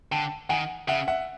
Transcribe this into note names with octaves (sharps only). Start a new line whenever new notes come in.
D3 G5 A5
D#3 F#5 G#5
C#3 E5 F#5
E5 F#5